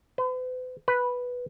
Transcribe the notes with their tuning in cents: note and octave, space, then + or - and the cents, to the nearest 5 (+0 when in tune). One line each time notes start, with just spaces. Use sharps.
B4 +45
B4 -5